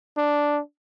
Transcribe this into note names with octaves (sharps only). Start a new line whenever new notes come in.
D4